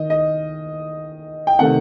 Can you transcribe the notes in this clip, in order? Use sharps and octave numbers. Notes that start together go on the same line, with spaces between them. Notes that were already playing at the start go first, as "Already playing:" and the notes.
Already playing: D#3 D#5
D#5
G5
C3 D#3 A3 F#5